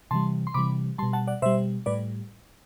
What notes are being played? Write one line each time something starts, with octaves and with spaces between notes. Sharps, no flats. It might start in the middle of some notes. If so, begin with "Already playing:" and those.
C3 E3 G3 A5 C6
C6
C3 E3 G3 B5 D6
B2 G3 A5 C6
F#5 A5
D5 F#5
B2 G3 C5 E5
A2 G3 B4 D5